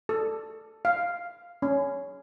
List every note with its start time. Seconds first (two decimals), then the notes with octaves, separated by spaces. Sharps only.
0.09 A4
0.85 F5
1.62 C#4